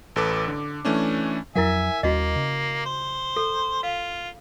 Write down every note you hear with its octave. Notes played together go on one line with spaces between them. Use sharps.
A1 A4 B4 D6
D3
E3 A3 C#4 D4
F2 F#3 E4 A#4 E5 F#5 G#5
D#2 G3 A#3 C#4 F#4 D#5
C#3
C5
A4
F4 F5